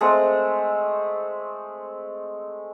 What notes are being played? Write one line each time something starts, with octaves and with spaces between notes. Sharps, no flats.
G#3 A3 C4